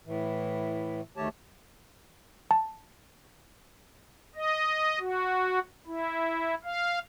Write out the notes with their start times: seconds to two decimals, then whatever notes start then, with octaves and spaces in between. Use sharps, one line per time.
0.06 A2 E3
1.17 D2 D#3 A3 G4 C#5 A5
2.51 A5
4.35 D#5
4.99 F#4
5.87 E4
6.64 F5